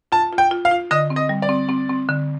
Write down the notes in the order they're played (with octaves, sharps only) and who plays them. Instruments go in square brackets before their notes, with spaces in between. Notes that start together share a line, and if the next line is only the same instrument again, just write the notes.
[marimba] F4 [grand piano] A5
[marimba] F4
[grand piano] G5
[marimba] F4
[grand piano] F5
[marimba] F4
[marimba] D3 [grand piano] D#5
[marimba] C4
[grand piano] D#5
[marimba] G3
[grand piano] D5
[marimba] C4
C4
C4
D3